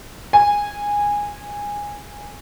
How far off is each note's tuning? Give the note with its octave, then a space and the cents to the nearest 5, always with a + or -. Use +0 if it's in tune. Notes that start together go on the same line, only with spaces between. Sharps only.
G#5 -15